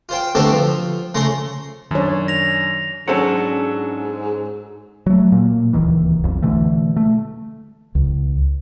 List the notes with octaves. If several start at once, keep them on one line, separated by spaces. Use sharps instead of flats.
F4 C5 G5
B2 D3 A3 C4 G4 A4
F3
C#3 A3 A#5 C6
F#2 D#3 D4 C#5
A#6 F7
G#2 F#3 C#4 D4 A4 C5 F#5 A5
F#3 A3
A#2 A#3
D1 C#2 D#3 E3
B1 F2
B2 D3 E3 A3
A3
C#2